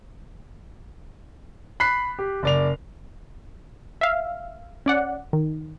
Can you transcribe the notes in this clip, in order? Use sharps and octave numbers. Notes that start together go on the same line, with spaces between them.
B5 F#6 B6 C7
G4
F#1 D5 F7
E5 F5
C#4 D5 F#5
D#3